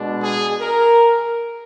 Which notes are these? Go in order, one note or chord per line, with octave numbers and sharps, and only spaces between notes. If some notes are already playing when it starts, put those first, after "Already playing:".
Already playing: B2 G#3 D4
G#4
A#4